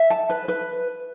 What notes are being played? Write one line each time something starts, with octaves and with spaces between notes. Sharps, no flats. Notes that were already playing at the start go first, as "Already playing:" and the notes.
Already playing: E5
A5
B4
B4